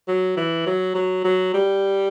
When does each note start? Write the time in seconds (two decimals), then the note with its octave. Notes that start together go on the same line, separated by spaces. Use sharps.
0.08 F#3
0.37 E3
0.67 F#3
0.95 F#3
1.25 F#3
1.54 G3